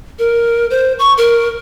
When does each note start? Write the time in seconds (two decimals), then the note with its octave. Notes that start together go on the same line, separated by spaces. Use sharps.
0.19 A#4
0.70 C5
0.99 C#6
1.18 A#4